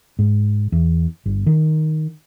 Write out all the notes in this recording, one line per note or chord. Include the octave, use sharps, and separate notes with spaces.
G#2
E2
G1
D#3